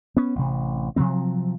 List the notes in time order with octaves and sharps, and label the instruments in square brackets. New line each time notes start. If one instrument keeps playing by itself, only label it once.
[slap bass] B3 C#4
A1 C3
C3 F3 F#3 C4